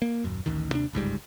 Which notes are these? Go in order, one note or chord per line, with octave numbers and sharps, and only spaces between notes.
A#3
D#1 F#2
A1 D2 D#3
D#2 C3 C4 D4
G1 C#2 G#2 G3